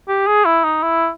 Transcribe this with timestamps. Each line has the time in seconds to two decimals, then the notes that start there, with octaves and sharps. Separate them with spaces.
0.08 G4
0.27 G#4
0.45 E4
0.64 D#4
0.83 E4